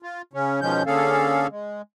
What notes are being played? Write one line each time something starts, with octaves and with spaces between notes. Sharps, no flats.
F4
C#3 C#4
B2 D#3 F3 G#3 C#4 G6
D3 A#3 C#4 G#4 A4 F5
G#3